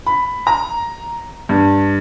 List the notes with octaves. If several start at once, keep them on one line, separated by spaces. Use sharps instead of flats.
B5
A#5
G2